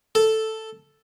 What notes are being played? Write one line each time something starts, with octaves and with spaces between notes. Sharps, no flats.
A4